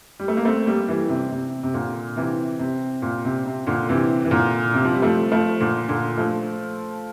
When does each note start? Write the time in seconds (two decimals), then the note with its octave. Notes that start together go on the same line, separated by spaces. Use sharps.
0.19 G3
0.28 A3
0.37 A#3
0.45 A3 C4
0.66 G3 A#3
0.88 E3 G3
1.09 C3
1.31 C3
1.63 C3
1.74 A#2 D3
2.16 C3 E3
2.59 C3
3.02 A#2
3.25 C3
3.46 C3
3.67 A#2 D3
3.89 C3 E3
4.25 E3
4.31 A#2 D3
4.74 C3
4.85 F3
4.94 G3
5.02 F3 A3
5.32 F3 A3
5.60 A#2 D3
5.89 A#2 D3
6.18 F3 A3